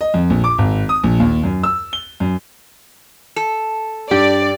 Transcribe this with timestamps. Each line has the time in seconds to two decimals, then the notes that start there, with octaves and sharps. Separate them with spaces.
0.01 D#5
0.14 F2
0.30 A#1
0.44 D6
0.58 G#1
0.89 D#6
1.04 A#1
1.20 D#2
1.44 F#2
1.63 E6
1.93 G7
2.20 F#2
3.36 A4
4.11 G2 G4 D5